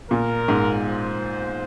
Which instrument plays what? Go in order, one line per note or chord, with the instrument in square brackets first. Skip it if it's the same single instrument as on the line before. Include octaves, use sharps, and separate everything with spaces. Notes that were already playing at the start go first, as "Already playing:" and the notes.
[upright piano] A#2 [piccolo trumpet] A#4
[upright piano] G#2
[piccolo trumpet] C5